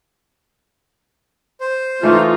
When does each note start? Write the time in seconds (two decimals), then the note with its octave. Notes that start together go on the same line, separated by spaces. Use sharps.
1.60 C5
2.03 E3 A3 D#4 F4